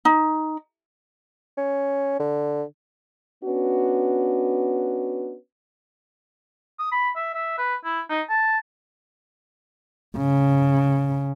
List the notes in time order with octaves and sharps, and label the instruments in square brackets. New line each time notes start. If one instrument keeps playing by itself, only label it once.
[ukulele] D#4
[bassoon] C#4
D3
[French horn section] B3 C#4 D4 F#4 B4
[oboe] D#6
B5
E5
E5
B4
E4
D#4
A5
[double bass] C#3